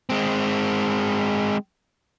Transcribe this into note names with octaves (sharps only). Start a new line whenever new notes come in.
G#3 C4